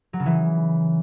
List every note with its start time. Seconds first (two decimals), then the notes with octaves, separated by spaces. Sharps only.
0.13 F#3
0.20 C#3
0.26 E3